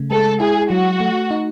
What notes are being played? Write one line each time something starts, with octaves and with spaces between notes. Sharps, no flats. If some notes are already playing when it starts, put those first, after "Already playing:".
Already playing: C#3 A3
G#3 A4
E4 G#4
F#3 F#4
A3
D#4